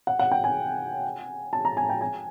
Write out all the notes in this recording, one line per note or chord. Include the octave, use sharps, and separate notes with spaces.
F#5
F#5
G5
G#5
A5
A#5
G#5
G5
G#5